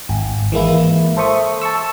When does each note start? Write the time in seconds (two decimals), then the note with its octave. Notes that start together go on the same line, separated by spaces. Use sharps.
0.09 G#1
0.52 E3 G#3 A#3 E4
1.17 A4 C5 E5 C#6 D#6
1.62 A5 C#6 E6